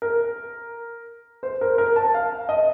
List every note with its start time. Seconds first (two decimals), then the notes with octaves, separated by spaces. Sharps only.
0.02 A#4
1.43 C5
1.61 A#4
1.78 A#4
1.96 A5
2.14 F5
2.49 D#5